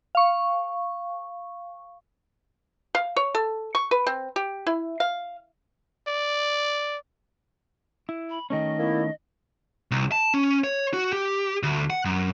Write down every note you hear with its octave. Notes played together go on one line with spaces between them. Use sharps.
F5 C#6
F5
C#5
A4
C#6
B4
C4
G4
E4
F5
D5
E4
B5
D#3 A3 C#4 D#5
A#3 B3 E4
C2
A5
C#4
C#5
F#4
G4
D2
F#5
F#2